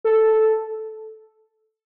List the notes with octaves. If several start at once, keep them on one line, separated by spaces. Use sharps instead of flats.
A4